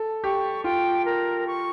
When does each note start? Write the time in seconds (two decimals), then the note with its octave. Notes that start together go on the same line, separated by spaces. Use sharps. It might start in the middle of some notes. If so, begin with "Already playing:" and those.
Already playing: A4
0.24 G4 C#6
0.64 F4 G5
1.05 A#4
1.47 C#6